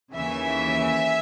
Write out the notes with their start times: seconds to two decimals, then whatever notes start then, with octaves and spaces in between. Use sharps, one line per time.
0.12 D#2 C#3 E3 E5 G#5